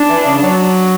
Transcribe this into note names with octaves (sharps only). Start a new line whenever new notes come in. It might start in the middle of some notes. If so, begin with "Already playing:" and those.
Already playing: D4
E3
C#3
F#3